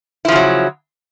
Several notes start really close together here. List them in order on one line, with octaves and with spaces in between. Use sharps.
E4 F3 C#3 F#3